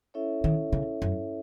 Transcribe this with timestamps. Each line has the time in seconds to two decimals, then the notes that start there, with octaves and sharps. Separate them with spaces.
0.14 C#4 E4 A4 C#5 E5
0.44 D#3
0.72 C#3
1.02 F#2